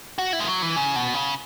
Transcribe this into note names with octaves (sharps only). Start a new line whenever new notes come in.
F#4
E4
G#3
F#3
E3
C#3
B2
C#3